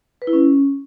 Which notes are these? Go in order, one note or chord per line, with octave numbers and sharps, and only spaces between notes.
B4
E4
C#4